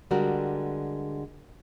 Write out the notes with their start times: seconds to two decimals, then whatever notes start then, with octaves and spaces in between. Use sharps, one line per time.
0.11 D3 G3 G#3 F#4 A#4